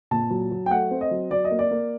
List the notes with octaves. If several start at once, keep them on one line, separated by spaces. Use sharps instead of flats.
A#2 A5
F#3
F#3
G5
A3 F#5
C4
D#5
F#3
F#3 D5
D#5
A#3
D5
A#3